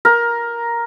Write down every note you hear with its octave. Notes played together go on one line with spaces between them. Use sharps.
A#4